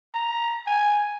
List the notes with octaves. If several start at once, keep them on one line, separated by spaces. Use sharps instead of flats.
A#5
G#5